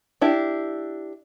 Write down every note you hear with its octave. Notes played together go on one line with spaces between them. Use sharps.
D4 E4 G4